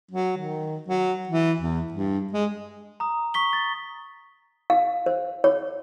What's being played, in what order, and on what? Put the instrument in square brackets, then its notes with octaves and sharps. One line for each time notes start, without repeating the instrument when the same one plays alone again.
[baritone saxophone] F#3
D#3
F#3
E3
E2
G2
G#3
[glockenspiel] A#5 D#6
C#6 B6 G7
A6
[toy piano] F5
C5
C#5